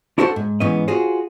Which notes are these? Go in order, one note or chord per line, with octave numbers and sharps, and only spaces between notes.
D4 E4 F#4 A4 C5 F#5
G#2
G#2 E3 B3 C#4 D#5
F4 F#4 G#4 C5